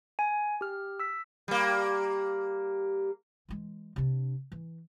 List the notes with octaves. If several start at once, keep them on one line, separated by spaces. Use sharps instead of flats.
G#5
G4 F6
E6 B6
G3 A#3
E3 G#3
C3 D4
E3